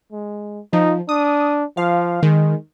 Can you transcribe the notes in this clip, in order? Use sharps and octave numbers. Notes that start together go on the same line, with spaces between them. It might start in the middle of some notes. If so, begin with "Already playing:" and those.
G#3
F3 D#4
D4 D#6
F3 F5
D#3 G#3